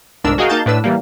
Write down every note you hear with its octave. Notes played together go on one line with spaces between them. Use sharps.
G1 C2 G#2 D4 A#4 E6
F#4 G#4 A#4 D#5 F5 G5
A#3 D#4 F5 A5 G6 A6
A2 D4 B4 E6
E3 G3 A#3